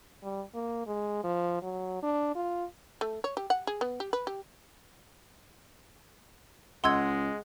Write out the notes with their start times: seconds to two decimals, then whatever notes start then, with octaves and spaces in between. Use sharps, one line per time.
0.23 G3
0.54 A#3
0.87 G#3
1.24 F3
1.62 F#3
2.03 D4
2.35 F4
3.01 A3
3.24 C#5
3.37 G4
3.50 F#5
3.67 G#4
3.81 B3
4.00 G4
4.13 B4
4.27 G4
6.84 C#2 G#3 D#5 F#5 C6 E6 G#6